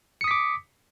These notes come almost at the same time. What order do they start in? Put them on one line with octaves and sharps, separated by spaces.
C#7 D#6 B6 D6